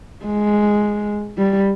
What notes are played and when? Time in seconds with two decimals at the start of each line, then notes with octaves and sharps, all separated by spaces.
0.25 G#3
1.38 G3